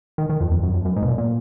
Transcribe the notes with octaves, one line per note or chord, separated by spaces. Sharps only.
D#3
D#3
F2
F2
F#2
F2
F#2
G#2
B2
A#2
A#2